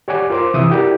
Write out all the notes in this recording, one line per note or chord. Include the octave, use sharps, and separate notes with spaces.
G4 C#5 D5 F#5 G#5 D6
F4 A#4 C5 C6 D6
C3 E3 E5 D#6
E4 F#4 G4 A#4 D5